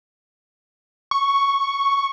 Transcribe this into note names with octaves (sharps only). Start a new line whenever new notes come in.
C#6